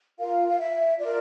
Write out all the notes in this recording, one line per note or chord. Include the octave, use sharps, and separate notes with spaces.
F4 A#4 F5
F5
E5
F4 A#4 D5